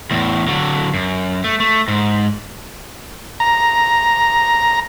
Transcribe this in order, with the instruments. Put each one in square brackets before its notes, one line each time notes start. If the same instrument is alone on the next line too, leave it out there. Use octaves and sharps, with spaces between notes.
[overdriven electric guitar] E2 A2
D3 F#3
F#2
A3
A3
G#2
[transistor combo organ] A#5